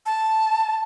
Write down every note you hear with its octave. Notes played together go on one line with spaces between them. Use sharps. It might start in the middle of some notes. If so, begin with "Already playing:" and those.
A5